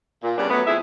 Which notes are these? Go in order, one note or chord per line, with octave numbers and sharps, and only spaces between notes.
A#2
C#3 G3 B3 D4
F#3 A3 B3
F2 E4 G#4 E5